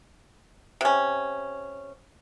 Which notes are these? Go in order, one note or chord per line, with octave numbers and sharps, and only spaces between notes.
C3 C#4